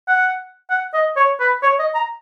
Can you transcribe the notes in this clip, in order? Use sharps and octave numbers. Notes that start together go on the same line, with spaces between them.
F#5
F#5
D#5
C#5
B4
C#5
D#5
A#5